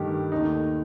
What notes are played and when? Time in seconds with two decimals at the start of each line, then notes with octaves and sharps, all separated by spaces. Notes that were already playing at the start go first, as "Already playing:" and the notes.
Already playing: G2 D#3 A3 G4
0.32 D#2 D#3 A3 D#4